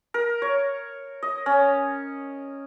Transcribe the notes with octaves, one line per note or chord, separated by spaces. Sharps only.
A#4
C#5
D#5
C#4